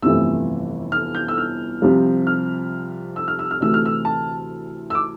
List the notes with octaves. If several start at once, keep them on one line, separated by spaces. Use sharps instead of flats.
G1 F2 C3 E3 A3 E6
F6
G6
E6
F6
C2 C3 F3
F6
E6
F6
E6
F6
D2 C3 E3 A3 E6
F6
E6
A5
E6
D6